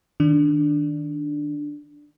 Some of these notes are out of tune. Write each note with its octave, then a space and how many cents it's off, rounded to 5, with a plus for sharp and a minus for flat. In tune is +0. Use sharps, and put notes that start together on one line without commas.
D#3 +0 D4 +0